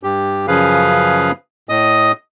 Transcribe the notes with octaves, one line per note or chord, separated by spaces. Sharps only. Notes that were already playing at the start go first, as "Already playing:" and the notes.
G2 G4
F#2 C#3 F3 G#4 B4 F5
A2 D#5 D#6